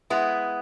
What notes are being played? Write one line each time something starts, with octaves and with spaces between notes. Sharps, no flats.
G#3 B3 E4